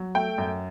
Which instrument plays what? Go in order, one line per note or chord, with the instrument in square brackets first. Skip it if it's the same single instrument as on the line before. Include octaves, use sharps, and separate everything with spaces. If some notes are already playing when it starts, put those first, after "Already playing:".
Already playing: [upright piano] F#3
A3 G5
F#2